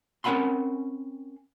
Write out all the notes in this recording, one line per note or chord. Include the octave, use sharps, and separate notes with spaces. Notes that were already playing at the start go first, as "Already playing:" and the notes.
C4 C#4 A#4 F#5 B5 C6